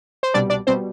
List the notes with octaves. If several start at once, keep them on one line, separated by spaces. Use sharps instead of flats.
C5
C2 B2 G3 D4 D5
D4 D5
B2 G3 C4 C5